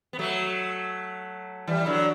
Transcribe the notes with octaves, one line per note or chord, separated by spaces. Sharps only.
B3
F#3 A3
E3 G3
D3 F#3